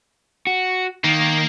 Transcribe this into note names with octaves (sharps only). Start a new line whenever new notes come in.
F#4
D#3 A#3